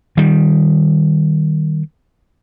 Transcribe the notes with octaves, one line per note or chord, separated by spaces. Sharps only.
D#3 G3